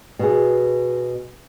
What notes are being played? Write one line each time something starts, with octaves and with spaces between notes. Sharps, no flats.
B2 G#4